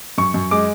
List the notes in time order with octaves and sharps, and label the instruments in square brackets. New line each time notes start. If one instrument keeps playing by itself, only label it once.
[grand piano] F#2 C#6
F#2
G#3 D6